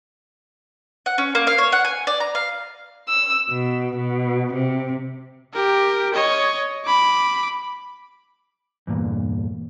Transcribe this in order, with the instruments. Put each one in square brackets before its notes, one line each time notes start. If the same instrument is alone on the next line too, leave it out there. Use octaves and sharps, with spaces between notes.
[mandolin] F#5
C#4
A#3
F5
C#5
F#5
G#5
D5
A#5
F5
[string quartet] E6
B2
B2
C3
[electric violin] G4 A#4
C#5 D#5
B5 D6
[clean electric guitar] E2 G2 A#2